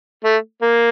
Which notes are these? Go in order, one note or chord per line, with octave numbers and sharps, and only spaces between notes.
A3
A#3